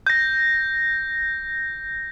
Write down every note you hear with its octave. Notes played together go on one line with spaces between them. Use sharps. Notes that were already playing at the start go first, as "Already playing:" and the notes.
G6 A#6